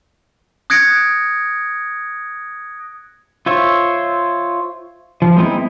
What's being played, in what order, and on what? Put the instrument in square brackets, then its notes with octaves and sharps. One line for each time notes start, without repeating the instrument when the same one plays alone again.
[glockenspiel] D#6 F#6 G#6 A#6 C#7 D7
[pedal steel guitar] F4 C5 C#5 E5
F3
G#3 B3 C4 D#4 E4